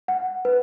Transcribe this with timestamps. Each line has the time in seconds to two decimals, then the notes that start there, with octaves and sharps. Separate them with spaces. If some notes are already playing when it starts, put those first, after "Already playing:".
0.08 F#5
0.45 B4